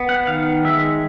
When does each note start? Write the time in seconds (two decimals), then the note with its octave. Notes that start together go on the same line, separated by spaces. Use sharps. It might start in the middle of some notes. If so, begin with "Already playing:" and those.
Already playing: B3
0.09 F#5
0.27 D#3 F5
0.64 G#3 E5